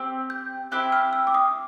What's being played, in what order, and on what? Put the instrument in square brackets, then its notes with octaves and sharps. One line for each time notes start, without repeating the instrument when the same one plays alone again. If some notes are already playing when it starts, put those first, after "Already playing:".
Already playing: [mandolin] C4 G4
[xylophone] G6
[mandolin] C4 E4 G4 [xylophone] F#6
[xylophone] F6
E6
D6
D#6